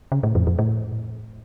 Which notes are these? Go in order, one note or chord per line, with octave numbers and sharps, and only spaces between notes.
C#3
A2
F2
F2
A2